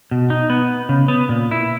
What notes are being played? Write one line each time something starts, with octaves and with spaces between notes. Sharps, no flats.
B2
D#4
B3
C#3
B3
A#2
E4